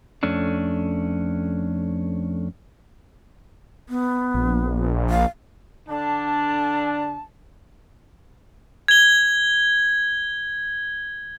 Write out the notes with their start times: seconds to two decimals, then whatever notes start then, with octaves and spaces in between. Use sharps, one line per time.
0.23 F2 A3 C#4 D4
3.89 B3
4.34 A#1
5.10 F5
5.88 D3 D4 A5
8.88 G#6 G7